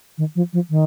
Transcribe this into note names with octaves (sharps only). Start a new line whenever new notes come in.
D#3
F3
F3
D#3